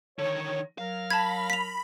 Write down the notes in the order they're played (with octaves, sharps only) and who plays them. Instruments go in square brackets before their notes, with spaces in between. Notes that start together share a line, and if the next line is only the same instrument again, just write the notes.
[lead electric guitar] D3 D#3 [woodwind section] C#5
[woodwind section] F#3 A#4 [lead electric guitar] F5
[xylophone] A5 G#6 [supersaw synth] B5
[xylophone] B6 F7